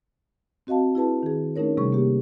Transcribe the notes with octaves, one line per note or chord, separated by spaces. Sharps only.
C4 F#4 D#5 F5 A5
E4 G#4 B4 A5
D#3 G#4
A3 C#4 D#4 A#4 C#5
C3 G3 A3 G#4 C#6
A#3 G4